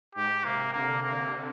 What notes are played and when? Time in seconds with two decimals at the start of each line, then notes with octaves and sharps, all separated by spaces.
0.15 G#2 G4
0.45 C3 A#3
0.73 D3 A#3
1.03 A#3